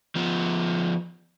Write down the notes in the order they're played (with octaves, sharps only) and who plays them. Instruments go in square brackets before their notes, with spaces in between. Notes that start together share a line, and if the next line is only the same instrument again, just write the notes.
[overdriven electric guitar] F3 B3